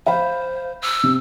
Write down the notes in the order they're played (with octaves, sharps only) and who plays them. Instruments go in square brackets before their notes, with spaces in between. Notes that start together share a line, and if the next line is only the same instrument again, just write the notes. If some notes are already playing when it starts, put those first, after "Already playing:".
[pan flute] C5 [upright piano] F5 B5
[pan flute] E6
[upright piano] C3